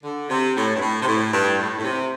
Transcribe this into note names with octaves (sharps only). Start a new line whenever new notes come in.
D3
C3
A2
G2
A2
C3
A2
G2
A2
A2
C3